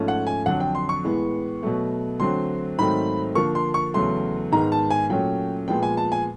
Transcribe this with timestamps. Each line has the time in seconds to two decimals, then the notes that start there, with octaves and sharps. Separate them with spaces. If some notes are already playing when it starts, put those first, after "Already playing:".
Already playing: G#2 F3 A3 C#4
0.08 F#5
0.27 G#5
0.46 F2 D3 F#3 F#5
0.60 G5
0.75 C6
0.89 C#6
1.04 A2 E3 G#3 B3
1.63 B2 F#3 A3
2.20 D3 F#3 A3 C4 C6
2.78 G#2 D#3 F#3 A3 C4 B5
3.35 D3 F3 A#3 C#6
3.55 C6
3.74 C#6
3.94 E2 C#3 F#3 A3 C6
4.52 G#2 D#3 G#3 B3 A#5
4.72 A5
4.90 G#5
5.10 A#2 F#3 A3 C#4 G5
5.68 A#2 F3 G#3 B3 G5
5.83 G#5
5.97 A5
6.12 G#5